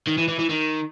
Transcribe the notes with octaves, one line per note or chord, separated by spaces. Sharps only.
D#3
E3
E3
E3
D#3